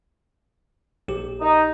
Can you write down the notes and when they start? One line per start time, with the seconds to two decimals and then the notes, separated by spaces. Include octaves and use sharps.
1.08 A#1 G4
1.41 D#4